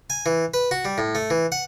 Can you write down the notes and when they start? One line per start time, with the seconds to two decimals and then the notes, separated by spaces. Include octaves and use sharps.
0.10 G#5
0.26 E3
0.54 B4
0.71 F#4
0.85 G3
0.98 A2
1.15 A3
1.30 E3
1.52 F#5